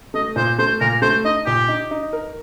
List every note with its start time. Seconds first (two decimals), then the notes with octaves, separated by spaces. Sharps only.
0.14 A3 D#5
0.36 A#2 C5
0.59 A3 C5
0.81 A#2 A#4
1.02 A3 C5
1.25 D#4 D#5
1.46 A#2 G4
1.68 D#4
1.91 D#4
2.13 A#4